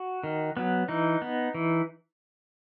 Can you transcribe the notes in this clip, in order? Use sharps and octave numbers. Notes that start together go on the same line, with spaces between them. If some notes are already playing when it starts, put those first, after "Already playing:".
Already playing: F#4
D#3
F#3 B3
E3 D#4
B3
E3